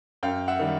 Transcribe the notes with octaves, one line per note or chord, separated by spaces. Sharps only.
F#2 F5 G5
E5 F#5
D#3 G3